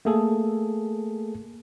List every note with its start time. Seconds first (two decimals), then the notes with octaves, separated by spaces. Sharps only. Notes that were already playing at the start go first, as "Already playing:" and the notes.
0.05 A3 A#3 G#4 A4